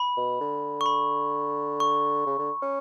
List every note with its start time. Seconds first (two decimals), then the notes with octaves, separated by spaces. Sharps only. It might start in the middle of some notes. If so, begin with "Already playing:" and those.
Already playing: B5
0.17 B2
0.40 D3
0.81 C#6
0.86 B5
1.80 C#6
2.26 C#3
2.39 D3
2.62 C#4